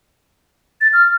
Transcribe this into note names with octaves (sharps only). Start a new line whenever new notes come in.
A6
F6